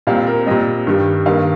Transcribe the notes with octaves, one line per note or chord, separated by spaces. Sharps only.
A#2 G3 C4 F5
A#4
A#2 G3 C4 D#5
G2 D#3 G3
G2 D#3 A#3 F5